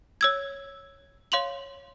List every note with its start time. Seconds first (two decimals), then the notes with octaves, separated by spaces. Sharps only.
0.21 C#5 E6 G#6
1.32 C#5 F5 C6 F7 F#7